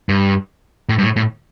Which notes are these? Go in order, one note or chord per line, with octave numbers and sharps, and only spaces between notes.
G2
A2
G2
A2
A2